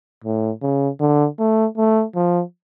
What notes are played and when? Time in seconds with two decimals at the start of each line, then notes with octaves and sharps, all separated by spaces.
0.24 A2
0.62 C#3
1.00 D3
1.39 A3
1.77 A3
2.16 F3